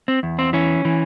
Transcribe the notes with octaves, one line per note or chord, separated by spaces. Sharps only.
C4
E2
C4
E3 C#4
E3